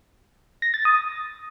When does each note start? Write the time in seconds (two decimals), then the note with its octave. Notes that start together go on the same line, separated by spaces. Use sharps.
0.62 A#6
0.74 A6
0.85 D#6